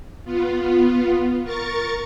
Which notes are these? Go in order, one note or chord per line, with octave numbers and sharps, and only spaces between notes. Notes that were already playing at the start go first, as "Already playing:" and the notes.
B3 F4
A#4 C#6 A6 C#7